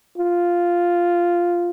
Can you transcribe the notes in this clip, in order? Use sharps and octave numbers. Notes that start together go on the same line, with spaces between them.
F4